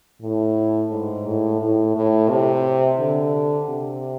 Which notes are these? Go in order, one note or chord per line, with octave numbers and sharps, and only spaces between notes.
A2
G#2
A2
A2
A2
C3
D3
C3